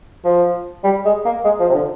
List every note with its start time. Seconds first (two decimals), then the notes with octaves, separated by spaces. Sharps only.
0.24 F3
0.84 G3
1.05 G#3
1.25 A#3
1.45 G#3
1.60 F3
1.69 C3
1.75 D3